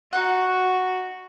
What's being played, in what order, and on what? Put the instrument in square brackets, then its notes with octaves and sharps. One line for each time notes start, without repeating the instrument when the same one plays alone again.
[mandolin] D#4 F#5 [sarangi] F#4